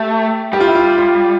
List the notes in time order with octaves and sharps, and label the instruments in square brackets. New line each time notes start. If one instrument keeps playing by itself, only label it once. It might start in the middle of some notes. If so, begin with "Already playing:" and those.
Already playing: [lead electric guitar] A3 [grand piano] G4
[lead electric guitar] G3 [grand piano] G4
[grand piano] F4
E4
F4
F4